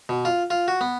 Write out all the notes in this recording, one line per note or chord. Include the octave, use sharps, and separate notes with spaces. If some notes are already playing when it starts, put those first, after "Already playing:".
B2
F4
F4
F#4
B3